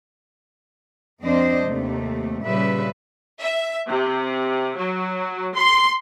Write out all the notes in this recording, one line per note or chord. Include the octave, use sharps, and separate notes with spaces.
F2 C4 D4 C5 D#5
D#2 C3 A3
A#2 C#3 G3 B4 E5
E5
C3
F#3
C6